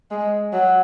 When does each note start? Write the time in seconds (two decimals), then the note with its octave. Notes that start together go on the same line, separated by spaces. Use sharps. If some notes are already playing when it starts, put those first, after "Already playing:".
0.11 G#3
0.53 F#3